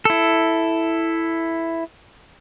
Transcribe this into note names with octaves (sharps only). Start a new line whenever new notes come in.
E4 A4